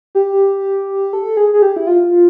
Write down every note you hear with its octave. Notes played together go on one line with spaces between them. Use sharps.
G4
A4
G#4
G#4
G4
E4
F4